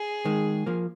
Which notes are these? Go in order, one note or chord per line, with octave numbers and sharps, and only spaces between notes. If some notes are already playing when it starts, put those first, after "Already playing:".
Already playing: G#4
D#3 G#3
F3 A#3